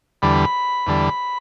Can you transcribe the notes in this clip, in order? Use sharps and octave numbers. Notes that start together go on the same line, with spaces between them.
E2 D3 G3 B5
E2 D3 G3